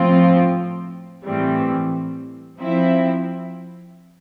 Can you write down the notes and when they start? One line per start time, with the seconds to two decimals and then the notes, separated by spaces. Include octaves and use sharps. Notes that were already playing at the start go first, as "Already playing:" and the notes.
Already playing: A2 F3 C4 F4
1.26 A2 E3 G3 C4
2.60 F3 C4 E4